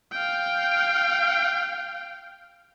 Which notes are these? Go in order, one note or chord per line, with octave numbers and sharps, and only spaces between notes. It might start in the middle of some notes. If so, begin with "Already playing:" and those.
F5 G5